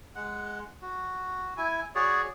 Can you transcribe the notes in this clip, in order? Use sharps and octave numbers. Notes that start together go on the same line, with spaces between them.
G#3 F#5
F#4
E4 G#5
F#4 G#4 C#5 D5